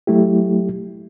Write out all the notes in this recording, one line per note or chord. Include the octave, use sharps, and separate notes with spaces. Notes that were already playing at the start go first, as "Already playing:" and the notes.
F#3 A3 E4 G4